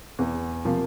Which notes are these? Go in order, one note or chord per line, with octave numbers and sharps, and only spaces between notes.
E2
C3 F3 A#3